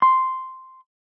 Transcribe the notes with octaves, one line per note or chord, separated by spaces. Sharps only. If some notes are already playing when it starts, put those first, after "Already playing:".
C6